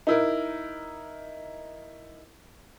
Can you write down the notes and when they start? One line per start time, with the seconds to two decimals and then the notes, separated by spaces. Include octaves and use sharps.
0.07 D#4 E4 A#4